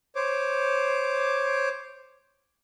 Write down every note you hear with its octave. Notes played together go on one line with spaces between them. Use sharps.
C5 C#5 D6